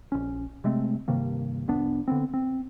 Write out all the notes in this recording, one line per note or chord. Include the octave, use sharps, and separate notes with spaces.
A#1 C#4
C3 G#3 A3 C4
G2 C3 D#3 A#3
F1 C2 B3 D4
D3 B3 C4
C4